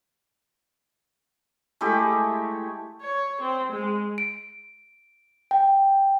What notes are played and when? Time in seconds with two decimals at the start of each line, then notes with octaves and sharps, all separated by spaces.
1.81 G#3 A3 E4 G4
3.02 C#5
3.42 C4
3.72 G#3
4.18 D7
5.51 G5